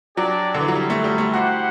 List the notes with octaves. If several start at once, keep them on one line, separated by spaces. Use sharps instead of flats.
F#3 D4 G4 D5
D3
E3
F#3
G3
A3
G3
A3
E4 F#4 G4 C5 F#5